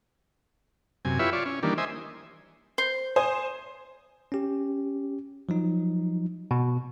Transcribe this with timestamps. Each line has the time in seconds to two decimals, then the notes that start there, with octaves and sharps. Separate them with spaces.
1.05 F#2 C3 G#5
1.19 E4 F4 G4 B4 C#5 E5
1.33 F4 C#5 D5
1.46 C#4
1.63 D#3 E3 G3 A#3 D4
1.78 C5 D#5 E5 G#5
2.78 C5
3.16 C5 G#5 D#6
4.32 C#4 G4
5.49 F3 F#3 D#4
6.51 B2